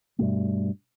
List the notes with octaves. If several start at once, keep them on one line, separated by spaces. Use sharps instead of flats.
G2 B2 A3